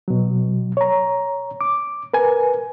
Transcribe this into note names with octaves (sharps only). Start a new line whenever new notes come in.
B2 F#3
C#5 A#5
D6
A#4 B4 G#5